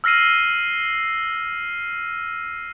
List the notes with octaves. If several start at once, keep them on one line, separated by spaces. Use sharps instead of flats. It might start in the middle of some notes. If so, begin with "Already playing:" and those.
E6 F6 A#6 C7 D#7